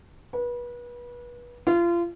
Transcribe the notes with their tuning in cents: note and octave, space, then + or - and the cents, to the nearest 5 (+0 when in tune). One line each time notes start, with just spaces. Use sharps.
B4 -30
F4 -30